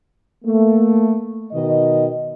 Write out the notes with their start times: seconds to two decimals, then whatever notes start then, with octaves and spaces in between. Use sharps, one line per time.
0.44 A3 A#3
1.52 B2 D#3 D#5